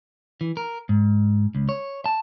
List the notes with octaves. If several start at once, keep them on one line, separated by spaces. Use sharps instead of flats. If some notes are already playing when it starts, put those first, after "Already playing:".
E3
A#4
G#2
C#2
C#5
A5